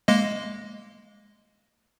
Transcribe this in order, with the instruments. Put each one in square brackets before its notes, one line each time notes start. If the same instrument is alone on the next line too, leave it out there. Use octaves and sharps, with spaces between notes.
[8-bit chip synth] G#3 A#3 D#5